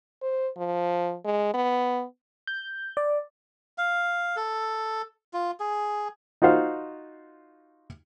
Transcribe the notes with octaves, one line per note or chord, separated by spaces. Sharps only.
C5
F3
G#3
B3
G6
D5
F5
A4
F4
G#4
D#4 F4 F#4 C5 F5